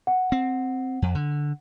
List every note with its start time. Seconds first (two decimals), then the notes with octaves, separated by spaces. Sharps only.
0.07 F#5
0.32 C4
1.02 F2
1.15 D3